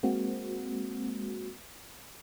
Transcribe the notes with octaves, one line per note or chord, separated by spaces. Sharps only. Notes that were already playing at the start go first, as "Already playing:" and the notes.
G#3 A#3 C4 F#4